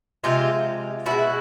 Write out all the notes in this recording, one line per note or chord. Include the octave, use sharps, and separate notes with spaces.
C3 F3 G#3 F4 G4
B2 G#3 E4 F#4